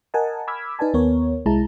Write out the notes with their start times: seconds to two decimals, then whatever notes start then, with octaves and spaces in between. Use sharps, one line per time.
0.14 A#4 D#5 F#5 G#5 A5
0.47 B5 D6 E6 F6 G#6 B6
0.79 D#4 B4 D5 G#5 A5
0.94 D#2 B3 A#4 C#5
1.46 C2 G#3 E4 A5 A#5